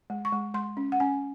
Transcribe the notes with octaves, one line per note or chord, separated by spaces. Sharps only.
G#3
C#6
G#3
G#3 C6
C#4
F#5
C#4 G#5